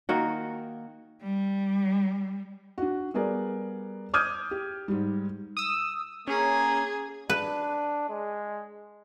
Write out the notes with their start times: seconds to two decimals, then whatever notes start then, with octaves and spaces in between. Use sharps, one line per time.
0.09 D#3 A#3 F#4
1.23 G3
2.78 D4 F#4
3.14 G3 B3 G#4 A#4 D5
4.14 D6 D#6 F6 G6 G#6 D#7
4.51 G4
4.88 G#2 G3
5.57 D#6 E6
6.28 A#3 C#4 G#4
7.30 D4 B4
8.09 G#3